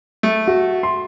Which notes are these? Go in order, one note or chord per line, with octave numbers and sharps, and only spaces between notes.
A3
F#4
C6